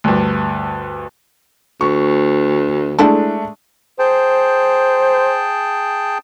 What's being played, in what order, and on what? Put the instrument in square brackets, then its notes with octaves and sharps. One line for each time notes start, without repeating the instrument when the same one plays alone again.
[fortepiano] D2 G2
[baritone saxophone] D2 [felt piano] C#6
[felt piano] G#3 A3 D4 [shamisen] E4 A4
[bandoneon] G#4 G5 A5 [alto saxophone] C5